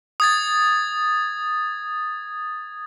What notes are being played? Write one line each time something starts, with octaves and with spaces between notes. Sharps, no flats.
D#6 G#6 A6